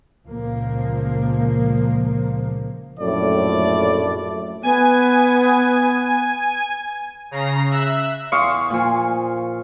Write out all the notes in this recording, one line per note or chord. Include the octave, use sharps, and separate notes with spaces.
C#2 A#2 F3 A#3
A#1 F#2 A2 A3 D5
B3 G#5
C#3 A#5 A#6 C7
E5 E6 F#6
E2 F5 C6 C#6 D#6
A#2 F3 G#5